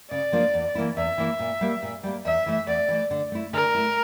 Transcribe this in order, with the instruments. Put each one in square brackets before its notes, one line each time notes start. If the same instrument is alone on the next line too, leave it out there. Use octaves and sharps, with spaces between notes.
[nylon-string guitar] C#3 [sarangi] D5
[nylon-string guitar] F3 A#3 D4 F4
E2
E3 A#3 E4
[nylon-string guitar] E2 [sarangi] E5
[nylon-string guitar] E3 A#3 E4
A#2
G3 A#3
A#2
G3 A#3
[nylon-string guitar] E2 [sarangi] E5
[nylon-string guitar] E3 A3
[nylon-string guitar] E2 [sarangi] D5
[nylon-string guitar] E3 A3
D3
A3 E4
[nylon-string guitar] D3 [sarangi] A#4
[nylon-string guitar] A3 E4